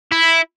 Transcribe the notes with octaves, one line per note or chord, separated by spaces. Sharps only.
E4